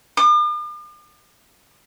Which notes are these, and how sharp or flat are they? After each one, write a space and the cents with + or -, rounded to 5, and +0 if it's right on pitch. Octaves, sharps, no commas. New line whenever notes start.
D6 +45